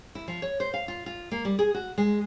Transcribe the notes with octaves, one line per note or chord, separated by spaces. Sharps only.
E4
F3
C#5
C5
F5
F4
F4
A#3
G3
G#4
F#4
G#3